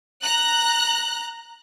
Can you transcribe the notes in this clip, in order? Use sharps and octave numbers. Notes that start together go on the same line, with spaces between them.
A#5 F#6